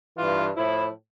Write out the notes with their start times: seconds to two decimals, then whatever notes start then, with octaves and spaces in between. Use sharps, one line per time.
0.17 G2 E3 F4
0.57 A2 F3 E4